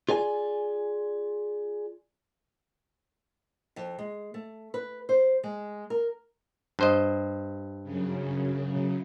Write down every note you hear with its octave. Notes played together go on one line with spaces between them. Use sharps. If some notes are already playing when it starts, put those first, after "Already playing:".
F4 G#4 D5 G#5
F2
G#3
A3
B4
C5
G#3
A#4
G2 C5 D#5
F#2 C#3